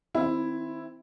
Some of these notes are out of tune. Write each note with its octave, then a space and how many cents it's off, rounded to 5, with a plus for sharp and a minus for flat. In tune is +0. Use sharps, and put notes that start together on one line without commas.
D#3 +30 C4 +0 E4 +0